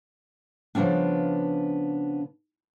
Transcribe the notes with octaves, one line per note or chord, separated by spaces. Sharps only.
C#3 F3 A#3 B3 C#4 D4